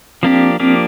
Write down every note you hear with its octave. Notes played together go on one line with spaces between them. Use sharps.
F3 A#3 C4 D4 G4
F3 A#3 C4 D4 G4